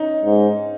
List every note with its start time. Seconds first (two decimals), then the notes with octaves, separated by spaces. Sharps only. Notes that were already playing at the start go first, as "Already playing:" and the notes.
Already playing: C#4 D#4
0.24 G#2